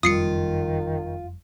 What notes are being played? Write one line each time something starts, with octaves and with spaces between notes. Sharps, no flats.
F#1 F2 D#3 G3 F4 D#6 C7 C#7